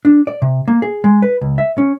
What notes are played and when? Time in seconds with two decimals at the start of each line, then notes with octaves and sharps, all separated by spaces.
0.05 D4
0.27 D5
0.42 C3
0.68 A#3
0.82 G#4
1.04 G#3
1.22 B4
1.41 C#2
1.58 E5
1.78 C#4